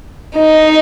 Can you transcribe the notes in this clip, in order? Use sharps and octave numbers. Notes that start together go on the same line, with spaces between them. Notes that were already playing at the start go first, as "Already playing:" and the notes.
D#4